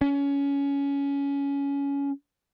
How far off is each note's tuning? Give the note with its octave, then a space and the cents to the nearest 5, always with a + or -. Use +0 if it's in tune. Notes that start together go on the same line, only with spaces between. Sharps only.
C#4 +20